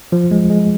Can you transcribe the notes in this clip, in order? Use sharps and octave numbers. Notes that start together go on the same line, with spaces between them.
F3
G#3
G#3